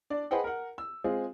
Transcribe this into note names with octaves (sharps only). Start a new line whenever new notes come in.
D4 D5
G#4 B4 C5 D#5 F#5 G5
A#4 F#5
E6
G#3 C4 F4 G#4